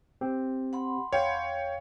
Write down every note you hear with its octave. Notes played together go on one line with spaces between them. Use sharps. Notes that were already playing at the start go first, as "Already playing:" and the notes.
C4 G4
F#5 B5 C6
E2 C#5 F5 G5